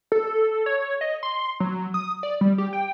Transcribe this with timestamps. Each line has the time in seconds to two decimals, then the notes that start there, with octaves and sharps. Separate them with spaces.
0.12 A4
0.66 C#5
1.01 D#5
1.23 C6
1.60 F#3
1.94 D#6
2.23 D5
2.41 G3
2.58 G4
2.73 G5